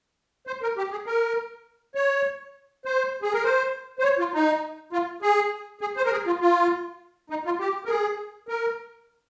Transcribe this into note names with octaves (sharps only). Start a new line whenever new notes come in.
C5
A#4
G4
G#4
A#4
C#5
C5
G#4
A#4
C5
C5
C#5
F4
D#4
F4
G#4
G#4
C5
A#4
G#4
F4
F4
D#4
F4
G4
A#4
G#4
A#4